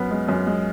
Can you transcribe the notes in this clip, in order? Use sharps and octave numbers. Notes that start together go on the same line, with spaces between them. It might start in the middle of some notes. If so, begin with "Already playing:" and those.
Already playing: F#2 B3
G#3
F#2
G#3